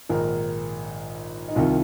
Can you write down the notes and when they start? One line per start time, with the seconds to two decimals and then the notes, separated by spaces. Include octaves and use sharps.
0.09 A#1 G#2 D#3 A#4
1.48 D#4
1.55 C2 C3 D#3 F4